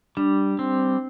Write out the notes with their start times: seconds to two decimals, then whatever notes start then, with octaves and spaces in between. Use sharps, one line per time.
0.17 G3 D4
0.59 C4